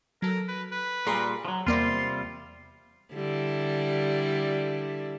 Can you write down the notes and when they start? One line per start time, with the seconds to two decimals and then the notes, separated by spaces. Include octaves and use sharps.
0.22 F#3 A4 A#4
0.48 B4
0.72 B4
1.07 A#2 G3 G#4 A#5 C6
1.45 F3 F#3
1.67 E2 C3 G3 A#3 F4 D5 C6
3.13 D3 G3 E4